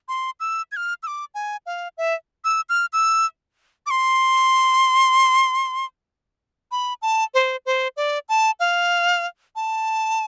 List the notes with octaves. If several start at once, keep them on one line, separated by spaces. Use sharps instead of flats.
C6
E6
G#6
F6
E6
D6
G#5
F5
E5
E6
F6
E6
D6
C6
B5
A5
C5
C5
D5
A5
F5
A5